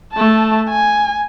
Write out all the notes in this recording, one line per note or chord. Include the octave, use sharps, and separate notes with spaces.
A3 A5
G#5